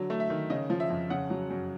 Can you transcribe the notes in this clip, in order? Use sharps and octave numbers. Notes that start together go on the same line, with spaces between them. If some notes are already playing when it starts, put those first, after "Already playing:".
Already playing: D3 F#3
A3
E5
D#3
C#3 D#5
F3
E5
F2
C#3 F#5
F#3
F#2